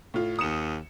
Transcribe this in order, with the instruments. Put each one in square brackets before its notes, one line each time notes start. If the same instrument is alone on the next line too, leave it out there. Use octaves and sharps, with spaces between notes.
[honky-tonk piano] A2 F4
[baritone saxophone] D#2 [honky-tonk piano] D#6 C#7 E7